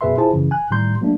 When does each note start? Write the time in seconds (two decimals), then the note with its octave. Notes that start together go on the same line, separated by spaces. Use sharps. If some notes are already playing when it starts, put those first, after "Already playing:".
0.01 F#2 B2 G#4 B4 E5 C6
0.18 E4 F4 G#4 C5 A5
0.33 F#2 C#3 E3
0.51 G#5 F#6
0.71 A2 D#3 G3 A#5 C6 G6
1.01 F#3 A3 A#3 D4